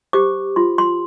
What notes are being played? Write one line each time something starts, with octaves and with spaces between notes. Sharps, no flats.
G4 C5 D6
F4 C6
C6